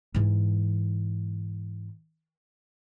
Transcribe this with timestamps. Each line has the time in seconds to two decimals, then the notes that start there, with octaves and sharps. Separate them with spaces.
0.14 G#2 E3